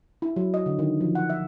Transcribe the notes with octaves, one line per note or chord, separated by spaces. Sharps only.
E4
F#3
D#5
D3
D#3
F3
F#5
E5